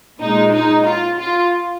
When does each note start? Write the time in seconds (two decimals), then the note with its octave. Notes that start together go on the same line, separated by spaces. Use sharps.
0.20 A#2 G#3 D#4
0.53 D#4
0.86 F4
1.19 F4